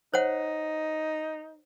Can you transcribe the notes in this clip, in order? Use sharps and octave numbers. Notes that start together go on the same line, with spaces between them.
D#4 C5 C#5 F#5